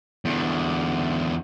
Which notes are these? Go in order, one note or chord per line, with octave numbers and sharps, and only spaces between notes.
E2 D3